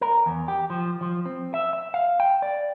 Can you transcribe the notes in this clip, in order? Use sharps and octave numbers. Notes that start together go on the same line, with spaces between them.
A#4
E2
G4
F3
F3
C4
E5
E5
F5
G5
D5